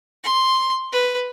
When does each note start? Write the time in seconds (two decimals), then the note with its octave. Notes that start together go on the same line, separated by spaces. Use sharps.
0.24 C6
0.92 B4